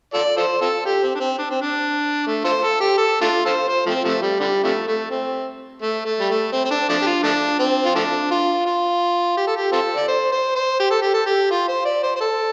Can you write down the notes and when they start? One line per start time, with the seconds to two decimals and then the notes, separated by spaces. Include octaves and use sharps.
0.14 F4 A4 D5
0.37 F4 A4 C5
0.61 C4 F4 A4
0.85 G4
1.03 C4
1.15 D4
1.20 C4
1.38 D4
1.50 C4
1.62 D4
2.26 A3
2.44 F4 A4 C5
2.63 A4
2.80 G4
2.98 A4
3.21 A3 D4 F4
3.46 F4 A4 C5
3.68 C5
3.86 F3 A3 C4
4.04 C3 F3 A3
4.22 G3
4.40 D3 G3
4.64 C3 F3 A3
4.87 A3
5.11 C4
5.82 A3
6.05 A3
6.20 G3
6.30 A3
6.52 C4
6.65 C4
6.71 D4
6.89 F3 A3 D4
7.02 G4
7.06 F4
7.24 F3 A3 D4
7.59 C4
7.85 F4
7.95 F3 A3 D4
8.31 F4
8.66 F4
9.37 G4
9.47 A4
9.56 G4
9.72 C4 F4 A4
9.96 D5
10.08 C5
10.32 C5
10.55 C5
10.80 G4
10.90 A4
11.02 G4
11.14 A4
11.26 G4
11.51 F4
11.68 C5
11.85 D5
12.03 C5
12.16 C5
12.21 A4